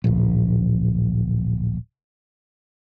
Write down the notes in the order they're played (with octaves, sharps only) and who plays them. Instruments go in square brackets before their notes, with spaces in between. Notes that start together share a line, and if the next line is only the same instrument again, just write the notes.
[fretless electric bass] D1 A#1